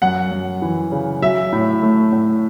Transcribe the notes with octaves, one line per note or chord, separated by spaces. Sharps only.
F#2 F#5
F#2
E3
C#3
F#3 E5
A2
A3
A2